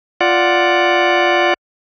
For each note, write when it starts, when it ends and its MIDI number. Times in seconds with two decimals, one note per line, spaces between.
0.21 1.54 65
0.21 1.54 74
0.21 1.54 78